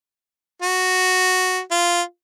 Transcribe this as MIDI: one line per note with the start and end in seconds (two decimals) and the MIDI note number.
0.62 1.59 66
1.71 2.02 65